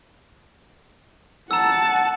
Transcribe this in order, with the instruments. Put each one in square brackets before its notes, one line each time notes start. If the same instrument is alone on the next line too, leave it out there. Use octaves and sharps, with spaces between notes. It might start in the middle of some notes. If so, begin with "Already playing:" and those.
[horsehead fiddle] F#5 A5 [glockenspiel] A#5 E6